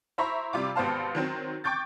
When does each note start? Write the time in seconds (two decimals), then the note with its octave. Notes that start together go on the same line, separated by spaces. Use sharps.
0.18 E4 C5 E5 A#5 B5 C#6
0.53 C3 G3 F4 D6
0.75 G#1 B3 G4 C5 F5 A5
1.15 D#3 F#3 C4
1.64 G5 C#6 D6 G6 A6